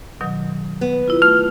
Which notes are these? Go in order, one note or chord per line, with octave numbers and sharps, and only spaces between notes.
B2 D#3 F#3
B3
E4 F4
A3 F6